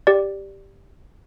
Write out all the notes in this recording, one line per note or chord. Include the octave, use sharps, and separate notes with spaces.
G4 D5